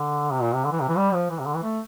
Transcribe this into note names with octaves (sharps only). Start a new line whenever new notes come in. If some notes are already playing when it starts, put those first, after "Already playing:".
Already playing: D3
C3
A#2
C3
D3
E3
C3
E3
G3
F3
E3
C3
D3
E3
A3